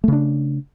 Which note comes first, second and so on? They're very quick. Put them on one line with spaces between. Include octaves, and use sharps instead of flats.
A3 C#3 D4